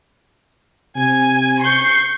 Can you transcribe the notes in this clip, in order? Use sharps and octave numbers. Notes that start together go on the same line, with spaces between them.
C3 G#5
C#6 G6 C7